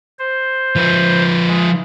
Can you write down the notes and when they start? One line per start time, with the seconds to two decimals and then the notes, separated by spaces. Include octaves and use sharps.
0.19 C5
0.76 F3 B4
1.48 G#3